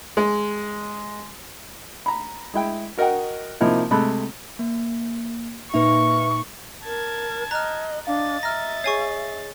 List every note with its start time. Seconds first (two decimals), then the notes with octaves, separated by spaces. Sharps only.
0.17 G#3
2.06 A#5 B5
2.54 G#3 E4 G5
2.97 F#4 A#4 D#5 F#5 G5
3.60 C3 F3 A#3 D#4 E4
3.91 C3 G#3 A3 B5 F#6
4.59 A#3
5.74 A#2 A#3 D#4 B4 E5 C#6
6.85 A#4 A5 G#6
7.51 D#5 A#5 F6 F#6
8.07 D4 D#5 F5 A6
8.43 E5 A#5 F6 A#6
8.84 G#4 C#5 G#5 C#6 C7